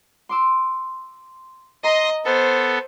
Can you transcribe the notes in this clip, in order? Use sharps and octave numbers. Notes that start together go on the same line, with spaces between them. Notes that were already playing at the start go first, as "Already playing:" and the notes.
C6 D6 E6
D#5 A#5 C6 D#6 A#6
B3 A4 C5